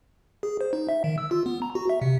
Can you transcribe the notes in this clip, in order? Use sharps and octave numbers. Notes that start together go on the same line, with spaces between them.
G#4
C5
D#4
E5
D#3
E6
F4
B3
A#5
F#4
E5
C3